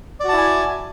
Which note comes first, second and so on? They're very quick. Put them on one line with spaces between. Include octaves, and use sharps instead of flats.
D5 F#4 A5 E4 G#5